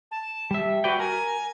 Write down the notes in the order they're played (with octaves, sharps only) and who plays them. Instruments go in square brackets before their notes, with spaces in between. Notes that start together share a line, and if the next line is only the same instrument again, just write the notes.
[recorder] A5
[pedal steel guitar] G3 E5
[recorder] F#4 [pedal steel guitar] B4 D5 G5
[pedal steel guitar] A#4 A#5 [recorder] G#5